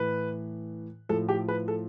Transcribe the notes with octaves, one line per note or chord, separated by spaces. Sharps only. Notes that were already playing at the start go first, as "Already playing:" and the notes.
Already playing: A2 E3 B4
A2 F3 A4
G4
B4
A4